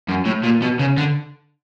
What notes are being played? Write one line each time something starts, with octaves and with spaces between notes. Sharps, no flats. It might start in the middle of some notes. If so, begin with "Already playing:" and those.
F#2
A2
A#2
B2
C#3
D3